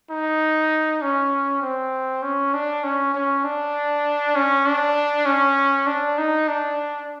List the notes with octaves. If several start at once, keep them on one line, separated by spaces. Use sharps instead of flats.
D#4
C#4
C4
C#4
D4
C#4
C#4
D4
C#4
D4
C#4
D4
D#4
D4